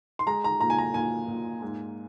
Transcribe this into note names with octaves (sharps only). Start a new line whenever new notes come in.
C6
G#3 A#5
A#5
A#2 A#5
G#5
A#5
A#2 G#5
A#2
G#2